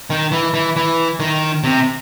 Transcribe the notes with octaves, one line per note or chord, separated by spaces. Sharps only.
D#3
E3
E3
E3
D#3
C3